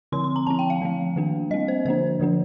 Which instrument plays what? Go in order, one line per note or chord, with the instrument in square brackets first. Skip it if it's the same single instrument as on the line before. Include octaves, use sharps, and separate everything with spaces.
[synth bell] D3 F3 C4 C6
C6
A#5
F3 C4 A5
G5
F5
F3 A3 C4
D#3 A#3 D4
G3 C4 D#5
C5
D3 F3 A#3 D4 C5
D3 F3 A#3 D4